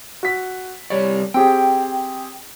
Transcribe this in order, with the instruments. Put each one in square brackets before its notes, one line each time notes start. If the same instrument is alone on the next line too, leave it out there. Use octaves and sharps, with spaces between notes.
[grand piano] F#4 B6
[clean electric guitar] C2 G3 D5 [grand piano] C#5
[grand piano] C4 G4 G#4 [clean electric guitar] G5